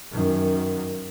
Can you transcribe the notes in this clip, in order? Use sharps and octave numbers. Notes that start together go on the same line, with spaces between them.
F#2 D#3